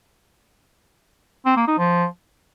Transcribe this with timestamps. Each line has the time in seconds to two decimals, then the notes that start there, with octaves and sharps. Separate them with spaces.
1.46 C4
1.57 A#3
1.68 D#4
1.79 F3